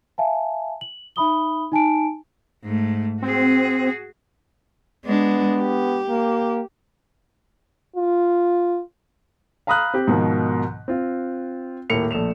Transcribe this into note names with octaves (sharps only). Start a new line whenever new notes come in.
E5 F5 G#5 A5
F#7
D#4 E5 B5 D#6 G7
D#4 G#5 A5 D7
G#2 A3
C4 F#4 G#4
G#3 B3 D4
G4
A#3
F4
F5 A#5 B5 D#6 F6 F#6
C4 G4
G#2 B2 D#3 F3
C4 F4
D#1 A2 A#3 C#7 F7
A#1 A3 E7 F7